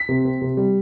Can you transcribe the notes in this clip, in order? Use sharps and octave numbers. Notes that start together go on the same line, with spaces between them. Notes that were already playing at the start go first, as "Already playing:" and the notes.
Already playing: B6
C3
C4
C3
G3